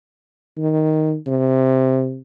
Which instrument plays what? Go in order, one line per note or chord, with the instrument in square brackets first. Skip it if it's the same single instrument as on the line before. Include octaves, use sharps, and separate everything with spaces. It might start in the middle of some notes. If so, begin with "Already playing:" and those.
[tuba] D#3
C3